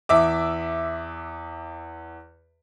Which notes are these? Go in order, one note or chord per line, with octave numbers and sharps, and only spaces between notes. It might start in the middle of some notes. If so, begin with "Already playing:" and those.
E2 E5 D6